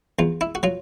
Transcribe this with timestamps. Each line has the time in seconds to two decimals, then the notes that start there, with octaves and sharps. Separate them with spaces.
0.19 E2 F4
0.41 E4
0.55 F#4
0.63 F#3 F4